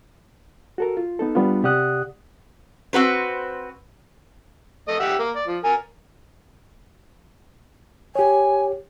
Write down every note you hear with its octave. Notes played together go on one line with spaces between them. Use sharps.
F#4 A4 A#4
F4
B3 D#4 A4
G3 B3 D4 F4
C3 G4 D5 F#5 D#6 F#6
C4 F#4 B4 C5
A3 D#5
G4 E5 F#5
A#3
D5
F3
A#4 G#5
G4 C#5 G#5